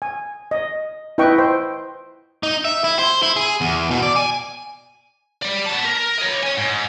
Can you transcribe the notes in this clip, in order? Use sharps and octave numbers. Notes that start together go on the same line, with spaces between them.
G#5
D#5
E4 B4 D#5 G5 C#6
C5 G5
D#4
E5
E4
C5
E4
G#4
E2
B2
D5
G#5
D5 B5
B3 A5
A#4
C#5 D#5
C#5 G#5
G#2